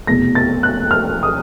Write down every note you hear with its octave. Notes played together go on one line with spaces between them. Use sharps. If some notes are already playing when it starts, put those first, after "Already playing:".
F1 E2 B2 A#6
A6
F#6
F6
D#6